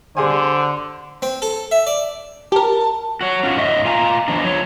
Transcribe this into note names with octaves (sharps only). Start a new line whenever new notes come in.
D3 G3 G#4 C5 G#5
C4
A4
E5
D5
G4 A#4 A5
F#4 C#5
C#4 F4 F#4
G#2 D#5 E5
F4 F5 G#5 A#5
E2 F3 D4 D#4
F3 C#5